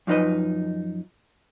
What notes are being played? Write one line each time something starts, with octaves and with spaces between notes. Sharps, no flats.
F#2 F3 D#4 B4 D#5